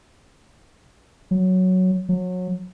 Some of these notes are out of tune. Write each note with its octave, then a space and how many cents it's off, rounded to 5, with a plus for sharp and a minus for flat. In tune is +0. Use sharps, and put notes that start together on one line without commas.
F#3 +0
F#3 -25